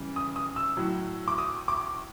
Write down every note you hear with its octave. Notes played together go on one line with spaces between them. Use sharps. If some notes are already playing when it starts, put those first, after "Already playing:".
Already playing: C#3 E3 G3
D#6
D#6
E6
A2 F#3
D6
D#6
D6